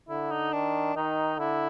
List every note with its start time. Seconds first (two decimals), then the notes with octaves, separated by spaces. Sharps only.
0.09 D3 E4
0.31 D#4
0.53 D#3 D4
0.95 D#3 D#4
1.39 D3 E4